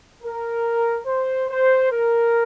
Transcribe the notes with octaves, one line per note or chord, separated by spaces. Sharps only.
A#4
C5
C5
A#4